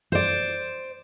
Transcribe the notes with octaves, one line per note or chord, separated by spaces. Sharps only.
C5 D5